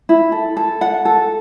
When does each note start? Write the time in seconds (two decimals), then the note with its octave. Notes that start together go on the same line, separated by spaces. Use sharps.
0.09 E4
0.32 A4
0.57 A4
0.81 F#5
1.05 A4